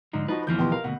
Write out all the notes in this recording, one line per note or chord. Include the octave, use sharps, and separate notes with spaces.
G#2 D3 F3 D#4
F3 D#4 F#4 B4
G1 D2 E3 F3 G6
B2 G4 C6
A#4 F5
D2 G#2 B2 F#5